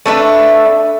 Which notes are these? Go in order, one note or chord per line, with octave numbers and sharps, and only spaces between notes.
A3 D4 B4 E5